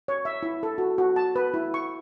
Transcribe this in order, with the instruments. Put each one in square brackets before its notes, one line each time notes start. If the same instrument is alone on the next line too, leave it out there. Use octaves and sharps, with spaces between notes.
[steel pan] C#5
E5
E4
A4
F#4
F#4
A5
B4
E4
C#6